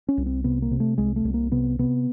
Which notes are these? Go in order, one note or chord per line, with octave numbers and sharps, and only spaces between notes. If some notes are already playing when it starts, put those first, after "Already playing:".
C#4
C2
C4
C3 B3
A#3
C3
A3
C2 G#3
A3
C2
A#3
C3 B3
C3 B3